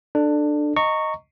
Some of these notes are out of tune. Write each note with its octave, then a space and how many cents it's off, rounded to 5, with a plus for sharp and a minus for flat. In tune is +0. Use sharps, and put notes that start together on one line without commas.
D4 +15 A4 +0
D#5 +0 A#5 -20 C#6 +0